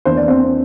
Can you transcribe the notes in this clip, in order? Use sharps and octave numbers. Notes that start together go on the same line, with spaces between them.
E2 E3 A#3 D4 C5
D5
C4 C5